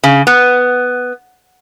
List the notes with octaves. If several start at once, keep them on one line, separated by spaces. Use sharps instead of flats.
C#3
B3